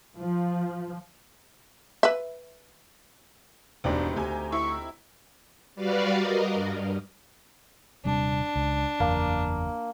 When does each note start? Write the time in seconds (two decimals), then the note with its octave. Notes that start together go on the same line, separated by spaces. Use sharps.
0.18 F3
2.03 B4 E5
3.84 E1 C#2 A2 C4 D4 D#4 G4
4.16 D2 G4 G#5 A#5
4.52 E4 C#6
5.76 G3 F#4 B4 D5 F5
6.15 A#4 D#5
6.53 G2
8.05 D#1 C3 G3 D4
8.56 C#2
9.00 F#1 E2 A#3